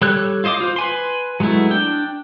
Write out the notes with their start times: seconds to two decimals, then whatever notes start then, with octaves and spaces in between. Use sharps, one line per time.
0.02 G3 A4 C#5 F#6
0.44 F4 C5 D#5 F5 D6
0.60 F4 C5
0.76 B4 G#5 C6
1.40 F#3 G#3 A3 B3 E4
1.70 D4 G5